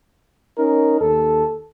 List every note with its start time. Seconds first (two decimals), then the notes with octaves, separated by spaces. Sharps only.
0.58 C#4 D#4 A#4
1.01 D#2 A4